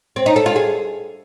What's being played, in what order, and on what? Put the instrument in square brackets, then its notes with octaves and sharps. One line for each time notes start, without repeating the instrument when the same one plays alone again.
[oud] C4
D#4
A4
F4
G#4